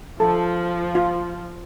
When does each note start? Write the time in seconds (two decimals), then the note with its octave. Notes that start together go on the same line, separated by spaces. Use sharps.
0.20 F3 A4
0.95 F4